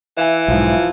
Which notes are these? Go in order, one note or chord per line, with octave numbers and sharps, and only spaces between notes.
E3 E5 F5 G#5
B1 G#2 F3